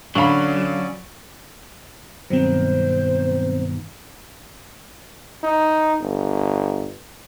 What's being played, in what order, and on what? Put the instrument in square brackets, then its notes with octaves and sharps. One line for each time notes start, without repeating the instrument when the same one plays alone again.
[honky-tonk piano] D3 F5 [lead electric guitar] F#3 [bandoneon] C#4 D5 [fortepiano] B5 C#6
[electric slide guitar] G2 B2 D#3 [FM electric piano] F#3 C4 [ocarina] C5
[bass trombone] D#4
G1